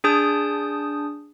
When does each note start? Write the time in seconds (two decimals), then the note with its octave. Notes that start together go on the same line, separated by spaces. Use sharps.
0.04 D4 G#4 A5 D#6 G6